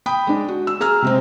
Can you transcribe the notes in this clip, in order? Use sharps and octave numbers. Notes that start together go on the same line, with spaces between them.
G5 B5 D#6
G#3 D4
F#4
E6
G#4 A#5 E6 F6
C3 G#3 C4